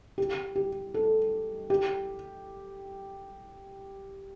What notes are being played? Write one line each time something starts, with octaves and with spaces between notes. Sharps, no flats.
G4
G4
A4
G4